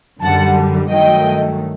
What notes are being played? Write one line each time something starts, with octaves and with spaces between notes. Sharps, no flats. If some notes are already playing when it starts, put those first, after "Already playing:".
F#2 D3 G3 F#5 A5
G2 D#3 F#3 A3 D#5 G5